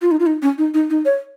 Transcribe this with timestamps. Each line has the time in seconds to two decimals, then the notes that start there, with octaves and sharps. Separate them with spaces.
0.02 F4
0.11 D#4
0.20 F4
0.26 D#4
0.42 C#4
0.58 D#4
0.74 D#4
0.90 D#4
1.05 C#5